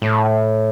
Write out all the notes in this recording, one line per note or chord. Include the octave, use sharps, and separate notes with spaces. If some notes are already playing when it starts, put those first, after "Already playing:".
A2